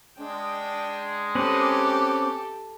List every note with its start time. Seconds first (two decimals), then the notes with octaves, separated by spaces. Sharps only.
0.18 G#3 D4 G5
1.35 C4 C#4 G4 A4 B4 D6